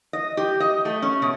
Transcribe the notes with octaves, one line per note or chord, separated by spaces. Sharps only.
D#5
G4
D#5
A3
C#4
B2